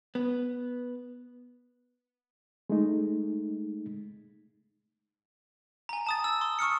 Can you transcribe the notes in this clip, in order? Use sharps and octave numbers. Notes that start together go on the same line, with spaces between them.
B3
G#3 A3 D#4
G#5 A#5
A5 D#6 A6
E6
C6 D#6
C#6 D#6 F6 C#7